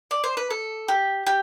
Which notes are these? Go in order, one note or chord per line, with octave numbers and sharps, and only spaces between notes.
D5
C5
B4
A4
G4
G4